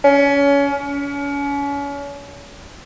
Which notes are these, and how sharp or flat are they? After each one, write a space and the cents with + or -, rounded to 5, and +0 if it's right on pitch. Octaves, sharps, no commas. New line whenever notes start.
C#4 +25
C#4 +35